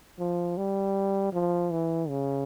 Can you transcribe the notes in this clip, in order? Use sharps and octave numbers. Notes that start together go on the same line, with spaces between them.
F3
G3
F3
E3
C#3